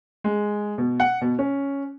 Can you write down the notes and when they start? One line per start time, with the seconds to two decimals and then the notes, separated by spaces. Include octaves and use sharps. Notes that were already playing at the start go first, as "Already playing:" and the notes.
0.24 G#3
0.78 B2
1.00 F#5
1.21 B2
1.39 C#4